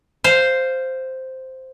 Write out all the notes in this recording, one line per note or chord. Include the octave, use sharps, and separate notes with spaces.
C5 F5